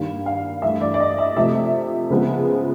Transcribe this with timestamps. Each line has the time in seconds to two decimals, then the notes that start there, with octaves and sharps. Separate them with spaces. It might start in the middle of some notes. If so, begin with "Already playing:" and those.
Already playing: G2 D#3 G3 A#3 F5
0.26 F5
0.62 G2 E3 A3 E5
0.81 D5
0.94 D5
1.00 D#5
1.18 E5
1.36 C3 F3 A3 E5
2.10 C#3 F3 G#3 B3